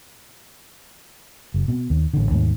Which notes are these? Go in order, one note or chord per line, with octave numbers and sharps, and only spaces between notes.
F#1
B2
D#2
A1 D3
D#2 G#2 A3